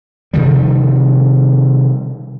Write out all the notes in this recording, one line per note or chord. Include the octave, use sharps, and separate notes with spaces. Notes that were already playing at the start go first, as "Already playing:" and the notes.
C3 D#3 F3 G3